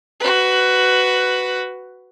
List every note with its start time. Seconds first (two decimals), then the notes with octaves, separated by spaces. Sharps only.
0.20 F#4 B4